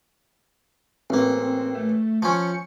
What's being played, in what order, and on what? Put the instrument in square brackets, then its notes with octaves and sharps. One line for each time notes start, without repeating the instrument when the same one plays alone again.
[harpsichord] A1 A#3 [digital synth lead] C4
[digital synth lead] A3
[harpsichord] F3 C#4 [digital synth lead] C#7